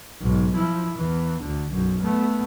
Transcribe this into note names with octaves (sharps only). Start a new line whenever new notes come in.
B1 G#2
F3 E4
E2 E3
D2 D3
B1 F#2
A3 B3